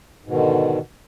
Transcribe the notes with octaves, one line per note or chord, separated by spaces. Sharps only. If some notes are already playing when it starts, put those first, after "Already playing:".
G#2 B2 D3 D#3